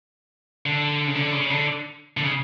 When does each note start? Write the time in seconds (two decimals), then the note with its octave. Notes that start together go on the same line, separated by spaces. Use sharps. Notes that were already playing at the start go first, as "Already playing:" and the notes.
0.66 D3
1.07 C#3
1.15 D3
1.32 C#3
1.50 D3
2.17 D3
2.24 C#3